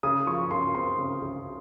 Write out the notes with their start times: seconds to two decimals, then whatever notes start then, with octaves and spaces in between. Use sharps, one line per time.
0.03 C#3 D#6
0.27 F3 C#6
0.51 C#3 C6
0.75 C4 C6
0.99 C#3
1.22 C#3